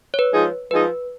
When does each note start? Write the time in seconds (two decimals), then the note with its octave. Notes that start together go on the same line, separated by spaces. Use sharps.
0.14 C#5
0.19 B4
0.32 F3 G#3 D#4 G#4
0.70 F3 G#3 D#4 G#4 B4